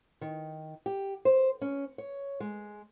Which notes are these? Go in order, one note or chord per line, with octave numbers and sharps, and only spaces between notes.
D#3
G4
C5
C#4
C#5
G#3